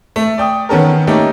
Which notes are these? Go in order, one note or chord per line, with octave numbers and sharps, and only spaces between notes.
A3
D5 G5 D#6
D#3 B3 C#4 A4 A#4
A3 A#3 C#4 D#4 G4